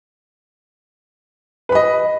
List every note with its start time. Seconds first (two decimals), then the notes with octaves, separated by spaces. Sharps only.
1.69 B4
1.72 B5
1.75 D#5